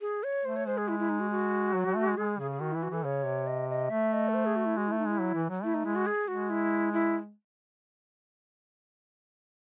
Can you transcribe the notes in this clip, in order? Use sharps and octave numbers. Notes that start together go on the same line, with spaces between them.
G#4
C#5
A3 C5
C#5
G#3 C5
G#4
E4
E4
D#4
F#4
F#4
F#3
F#3
A3
G#3
G#3 G#4
C#3 G#4
G#4
D#3 F#4
E3 E4
F#4
E3 A4
C#3 C#5
C3
D#5
D#5
A3 E5
D#5
A4
C5
G#4
F#4
E4
G#3 F#4
A3 E4
D#4
G#3 E4
F#3
E3
F#3
A3 E4
D#4
G#3 E4
F#4
G#4
G#3 F#4
E4
E4